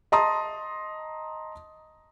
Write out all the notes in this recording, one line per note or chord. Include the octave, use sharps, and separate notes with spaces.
D#5 A5 A#5 C6 D#6